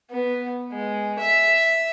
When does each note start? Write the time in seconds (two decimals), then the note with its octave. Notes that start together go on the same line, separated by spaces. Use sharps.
0.11 B3
0.73 G#3
1.20 E5